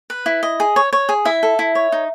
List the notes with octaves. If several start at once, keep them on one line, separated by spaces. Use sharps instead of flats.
B4
E4
D#5
G#4
C#5
C#5
G#4
E4 E5
A4
E4
C#5
D#4